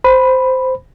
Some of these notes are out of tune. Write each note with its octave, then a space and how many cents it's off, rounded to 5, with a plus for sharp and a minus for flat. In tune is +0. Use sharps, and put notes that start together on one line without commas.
C5 -10 B5 +0